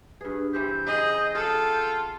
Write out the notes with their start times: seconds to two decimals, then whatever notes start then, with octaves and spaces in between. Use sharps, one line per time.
0.21 G2 G#4 B4
0.53 E3 C4 G4 G6
0.87 C#3 C4 G#4 D#5
1.35 F4 G#4 A4 F#5
1.79 A5